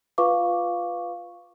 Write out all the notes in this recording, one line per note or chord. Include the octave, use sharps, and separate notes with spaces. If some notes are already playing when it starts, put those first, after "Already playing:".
F4 B4 F5 C#6 D6